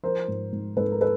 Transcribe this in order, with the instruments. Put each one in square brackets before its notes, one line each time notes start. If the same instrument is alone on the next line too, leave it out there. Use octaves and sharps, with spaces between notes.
[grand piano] F3 A#4 C5
G#2
G#2
G#2 A4 B4
A#4
A4 B4